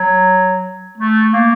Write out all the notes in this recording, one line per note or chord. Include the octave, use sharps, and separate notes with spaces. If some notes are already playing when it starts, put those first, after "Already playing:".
Already playing: F#3
A3
A#3